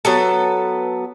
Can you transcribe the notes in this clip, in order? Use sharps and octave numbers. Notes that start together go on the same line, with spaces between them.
F#3 B3 A4